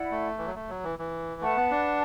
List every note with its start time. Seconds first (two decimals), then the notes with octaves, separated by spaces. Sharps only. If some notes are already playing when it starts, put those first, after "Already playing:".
Already playing: E4 D5 F#5 B5
0.11 A3
0.38 E3
0.46 F#3
0.55 A3
0.69 F#3
0.84 E3
0.99 E3
1.41 A3 B4 F#5 A5
1.56 B3
1.71 D4